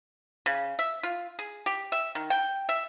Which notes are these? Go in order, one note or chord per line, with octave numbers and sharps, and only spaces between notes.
C#3
E5
F4
G#4
G4
E5
D#3
G5
E5